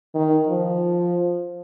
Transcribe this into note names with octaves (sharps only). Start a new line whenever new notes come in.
D#3
F3